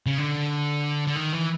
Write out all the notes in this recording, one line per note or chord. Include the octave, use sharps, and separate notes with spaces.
C#3
D3
D3
D#3
E3